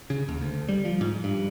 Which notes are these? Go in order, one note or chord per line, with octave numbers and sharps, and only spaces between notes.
C#3
D#2
D2
G3
F3
G#2
G2